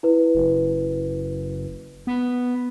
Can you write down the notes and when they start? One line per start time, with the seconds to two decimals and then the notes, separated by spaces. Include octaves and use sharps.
0.03 E4 B4
0.35 F#1
2.07 B3